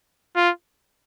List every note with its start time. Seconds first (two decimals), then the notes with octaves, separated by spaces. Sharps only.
0.36 F4